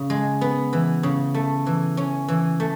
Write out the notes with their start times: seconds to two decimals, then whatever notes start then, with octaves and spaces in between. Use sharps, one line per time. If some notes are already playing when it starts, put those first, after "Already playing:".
Already playing: C#3
0.10 G#3
0.41 B3
0.73 E3
1.03 C#3
1.34 A3
1.66 E3
1.97 C#4
2.28 E3
2.60 A3